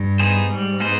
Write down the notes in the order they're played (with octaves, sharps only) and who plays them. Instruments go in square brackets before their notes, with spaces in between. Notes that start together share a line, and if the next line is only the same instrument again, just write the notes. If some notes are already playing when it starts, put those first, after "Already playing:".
Already playing: [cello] G2
[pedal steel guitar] B3 D#4 G#4 C5
[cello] G#2 [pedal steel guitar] G3
[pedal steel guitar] B3 D#4 G#4 C5